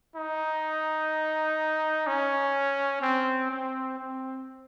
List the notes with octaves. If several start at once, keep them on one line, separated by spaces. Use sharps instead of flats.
D#4
C#4
C4
C4
C4